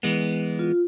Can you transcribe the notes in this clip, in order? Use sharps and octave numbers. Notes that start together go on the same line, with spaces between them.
E3 G#3 B3
F4